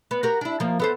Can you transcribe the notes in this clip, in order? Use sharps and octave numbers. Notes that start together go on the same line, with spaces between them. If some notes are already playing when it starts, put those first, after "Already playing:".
B3
F#4 G4 A#4
D4 E4
F3 A#3
B3 A4 C5